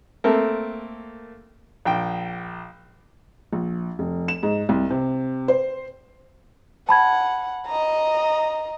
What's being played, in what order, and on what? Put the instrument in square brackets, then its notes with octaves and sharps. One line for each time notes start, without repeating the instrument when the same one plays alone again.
[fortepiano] A3 A#3 C4 A4 A#4
A#1 G5
[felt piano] A#1
F1
E7
G#2
C2
C3
C5
[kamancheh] F#5 [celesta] A5 B5 G#6
[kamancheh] D#5 A#5